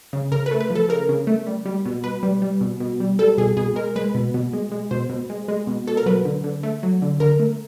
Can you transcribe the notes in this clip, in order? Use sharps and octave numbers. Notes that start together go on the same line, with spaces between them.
C#3
C#3 A#4
A3 B4
B4
F3
A4
C#3 A#4
C#3
A3
G3
G3
B2
B2 B4
G3
G3
B2
B2
G3
G3 A4
B2 G#4
B2 G#4
G#3 A#4
G#3 B4
B2
B2
G#3
G#3
B2 C5
B2
G#3
G#3
B2
B2 A4
A#4
F#3 B4
D3
D3
A3
F#3
D3
D3 A#4
A3